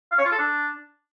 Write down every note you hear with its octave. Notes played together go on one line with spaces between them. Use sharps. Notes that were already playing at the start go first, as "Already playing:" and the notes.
F5
C#5
F4
A4
D4